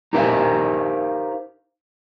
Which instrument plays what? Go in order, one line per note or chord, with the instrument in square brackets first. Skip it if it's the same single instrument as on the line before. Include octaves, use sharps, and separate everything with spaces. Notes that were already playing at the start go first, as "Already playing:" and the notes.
[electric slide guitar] D#4 G4 A#4 C5 E5 F5